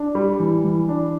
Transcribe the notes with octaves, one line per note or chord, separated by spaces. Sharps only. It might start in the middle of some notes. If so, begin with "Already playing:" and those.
Already playing: D4
G3
E3
E3
D4